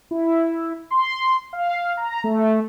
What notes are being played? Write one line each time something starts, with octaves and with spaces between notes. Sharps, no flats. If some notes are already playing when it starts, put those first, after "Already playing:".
E4
C6
F5
A#5
A3